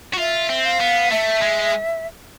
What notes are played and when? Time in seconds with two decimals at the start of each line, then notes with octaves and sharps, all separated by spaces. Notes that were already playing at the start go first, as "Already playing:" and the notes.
0.14 F#4
0.18 F4 E5
0.49 C4
0.65 F5
0.80 B3
1.11 A3 E5
1.42 G#3